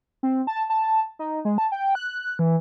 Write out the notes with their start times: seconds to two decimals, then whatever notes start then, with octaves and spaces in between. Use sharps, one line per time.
0.23 C4
0.47 A5
0.70 A5
1.19 D#4
1.45 G#3
1.58 A5
1.72 G5
1.95 F#6
2.39 E3